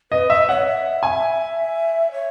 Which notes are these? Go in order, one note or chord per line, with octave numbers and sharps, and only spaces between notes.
B4 D#5
D#5 E5
C#5 F#5
E5
G#5
C#5